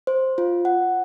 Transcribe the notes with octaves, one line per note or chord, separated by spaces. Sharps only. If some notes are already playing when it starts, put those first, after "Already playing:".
C5
F4
F#5